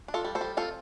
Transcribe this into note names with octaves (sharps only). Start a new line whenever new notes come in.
D4
F4 A4
G3
A4 C5
G3
C4 F4 A4